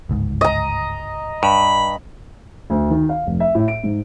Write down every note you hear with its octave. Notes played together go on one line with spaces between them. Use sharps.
G1 C#2 G#2
D#5 A#5
G2 B5
D2
D#3
F5
F1
E5
A2
D7
G#2